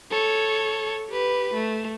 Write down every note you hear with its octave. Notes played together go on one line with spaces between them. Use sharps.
A4 C#5
G4 B4
A3